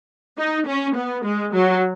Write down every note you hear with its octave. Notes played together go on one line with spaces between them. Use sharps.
D#4
C#4
B3
G#3
F#3